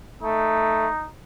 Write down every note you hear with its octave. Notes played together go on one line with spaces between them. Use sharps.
A3 D#4